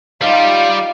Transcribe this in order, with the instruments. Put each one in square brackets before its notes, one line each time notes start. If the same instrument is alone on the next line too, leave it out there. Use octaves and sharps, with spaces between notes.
[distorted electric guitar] G3 G4 [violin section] D#4 F4 [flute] F5